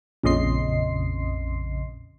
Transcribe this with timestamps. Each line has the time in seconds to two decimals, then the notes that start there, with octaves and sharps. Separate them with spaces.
0.23 A#1 F2 C#3 D#5 C6 C7